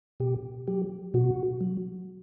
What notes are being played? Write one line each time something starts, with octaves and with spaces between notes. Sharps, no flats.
B2 G4
F#3 G4
B2 F#4
F#3